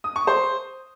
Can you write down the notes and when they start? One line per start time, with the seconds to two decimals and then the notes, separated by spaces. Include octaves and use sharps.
0.04 D#6
0.16 C#6
0.27 C5